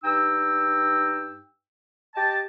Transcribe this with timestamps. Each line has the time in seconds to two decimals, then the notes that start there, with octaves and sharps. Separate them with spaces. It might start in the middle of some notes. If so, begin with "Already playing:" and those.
0.04 G2 D#4 G5 E6
2.15 G4 D#5 G5 A5